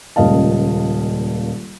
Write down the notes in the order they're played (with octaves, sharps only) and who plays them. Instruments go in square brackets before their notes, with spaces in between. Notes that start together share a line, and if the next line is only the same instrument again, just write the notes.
[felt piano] D#1 C#2 A#2 D#5 F5 A5